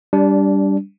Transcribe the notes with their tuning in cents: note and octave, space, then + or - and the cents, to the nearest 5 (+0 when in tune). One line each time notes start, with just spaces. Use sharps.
G3 +0 D4 -20